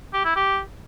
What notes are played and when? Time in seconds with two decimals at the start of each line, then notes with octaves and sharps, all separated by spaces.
0.14 G4
0.25 E4
0.36 G4